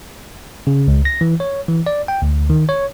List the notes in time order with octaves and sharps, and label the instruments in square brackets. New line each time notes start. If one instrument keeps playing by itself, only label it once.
[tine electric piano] C#3
C#2
A#6
E3
C#5
E3
D5
G5
D2
D#3
C#5